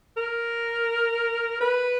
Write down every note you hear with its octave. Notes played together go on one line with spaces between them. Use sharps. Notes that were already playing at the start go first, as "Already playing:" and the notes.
A#4
B4